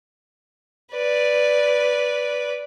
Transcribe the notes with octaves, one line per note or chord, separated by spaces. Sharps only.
B4 D5